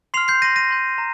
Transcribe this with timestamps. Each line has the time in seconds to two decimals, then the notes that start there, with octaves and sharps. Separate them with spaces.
0.14 C6 F6 C7 F7
0.28 G6 C7
0.42 C6 G6 A#6 D#7
0.56 A#6 D#7
0.70 C6 G6
0.98 A#5